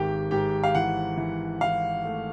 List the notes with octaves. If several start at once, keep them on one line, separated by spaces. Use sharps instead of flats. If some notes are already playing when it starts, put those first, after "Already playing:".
Already playing: G#1 D#3 G#3 G4 G5
G#2 G4 G5
F5
E3 F#5
E3
E3 F5
A3